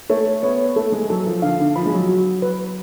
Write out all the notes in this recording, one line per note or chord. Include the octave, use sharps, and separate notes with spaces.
A3 C#5
B3 C#5
A3 A4
G#3
F#3 A4
F3
D3 F5
D3
F3 B5
G#3
F#3
F#4
B4